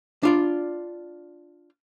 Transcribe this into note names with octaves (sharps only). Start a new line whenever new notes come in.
D4 F4 D5